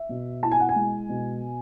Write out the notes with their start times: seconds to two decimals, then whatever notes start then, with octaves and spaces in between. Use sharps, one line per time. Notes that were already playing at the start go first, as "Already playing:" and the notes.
Already playing: E5
0.09 B2
0.43 E4 A5
0.52 G#5
0.60 F#5
0.69 G#5
0.76 G#3
1.09 B2